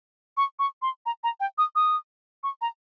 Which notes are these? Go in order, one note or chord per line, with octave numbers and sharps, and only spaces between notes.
C#6
C#6
C6
A#5
A#5
G5
D#6
D#6
C#6
A#5